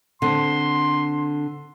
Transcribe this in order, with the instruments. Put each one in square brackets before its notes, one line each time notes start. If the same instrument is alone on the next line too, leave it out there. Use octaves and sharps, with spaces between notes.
[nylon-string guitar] D3 C4 [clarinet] C6